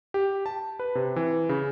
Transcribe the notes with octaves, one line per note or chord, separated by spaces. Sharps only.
G4
A5
B4
C3
E3
C#3